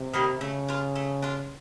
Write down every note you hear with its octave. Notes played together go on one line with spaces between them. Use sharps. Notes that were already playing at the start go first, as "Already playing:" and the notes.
Already playing: C3
D#3 G3 A#3
C#3 A3
D4 F4
A3
D4 F4